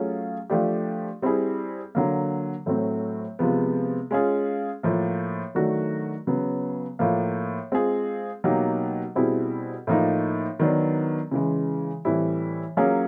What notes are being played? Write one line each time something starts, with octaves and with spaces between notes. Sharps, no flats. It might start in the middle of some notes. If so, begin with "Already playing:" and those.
Already playing: F#3 A3 C#4 F4 G#4
F3 A3 D4 G4
G3 C4 E4 G#4
D3 F#3 A#3
A2 F#3 A3 C4
C3 F3 G#3 B3
G#3 C#4 F4 G#4
A2 F3 A#3
D#3 F#3 A3 D4 F#4
C#3 F#3 B3
A2 F3 A#3
G#3 C4 F4 G#4
B2 F#3 A#3 D#4 G4
B2 G3 C4 E4 G#4
A2 F3 A#3 D#4
D#3 F#3 B3 D4
C#3 E3 G#3
A2 E3 G3 C4 E4
F#3 A#3 C#4 F4 G#4